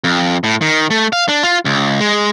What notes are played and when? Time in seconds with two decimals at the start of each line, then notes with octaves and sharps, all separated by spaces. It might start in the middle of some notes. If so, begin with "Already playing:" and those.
0.04 F2
0.44 A2
0.61 D#3
0.90 A3
1.13 F5
1.29 D4
1.43 F4
1.65 C#2
2.00 G#3